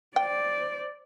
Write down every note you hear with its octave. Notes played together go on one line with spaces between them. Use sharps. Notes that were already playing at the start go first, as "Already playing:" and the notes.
C5 D5 G5